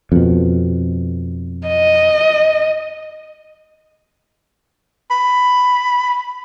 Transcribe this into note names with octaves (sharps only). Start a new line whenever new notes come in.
F2 B2
D#5
B5